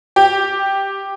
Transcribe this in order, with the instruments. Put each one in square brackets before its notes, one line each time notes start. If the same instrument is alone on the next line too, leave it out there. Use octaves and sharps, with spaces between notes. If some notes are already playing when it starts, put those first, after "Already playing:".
[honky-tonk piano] G4